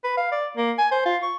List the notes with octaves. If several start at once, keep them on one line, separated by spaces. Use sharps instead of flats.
B4
F5
D5
A#3
G#5
C5
F4
C#6